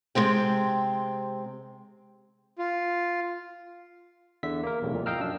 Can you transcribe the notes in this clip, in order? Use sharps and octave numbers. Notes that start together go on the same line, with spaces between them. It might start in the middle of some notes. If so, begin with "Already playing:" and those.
C3 G#3 C4 G5
F4
E2 D3 E5 B6
A#3 A#4
B1 E2 A2 C3
C2 F2 A#2
D#5 F5 G5 A#5 E6 F6
F#2 D4 E6